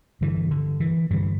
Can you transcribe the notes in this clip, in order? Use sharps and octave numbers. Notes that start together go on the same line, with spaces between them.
G2 D3 E3
D3
E3
G2 D3 E3